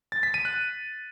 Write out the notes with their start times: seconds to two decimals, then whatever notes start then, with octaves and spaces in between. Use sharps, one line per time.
0.12 A6
0.23 B6
0.34 D#7
0.45 F#6